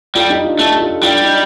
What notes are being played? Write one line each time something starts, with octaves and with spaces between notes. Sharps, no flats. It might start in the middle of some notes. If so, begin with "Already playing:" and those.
G3 F4 A4
D#4 G4
D4 F4
A3 D#4 G4
F4 A4
G3 D4 F4
D#4 G4